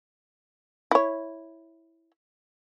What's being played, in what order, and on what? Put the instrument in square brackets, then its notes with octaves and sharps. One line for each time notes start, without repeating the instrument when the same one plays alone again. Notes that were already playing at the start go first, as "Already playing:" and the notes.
[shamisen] E4 C#5